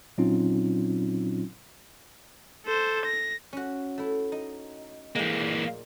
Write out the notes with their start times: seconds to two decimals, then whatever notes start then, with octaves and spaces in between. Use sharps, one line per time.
0.18 A#2 F#3 C4 C#4 D#4 F4
2.66 A4 C5
3.05 A#6
3.53 C#4 F#4
3.98 A3 E4
4.32 D#4
5.15 E3 G#3 A#3 G5
5.40 A#2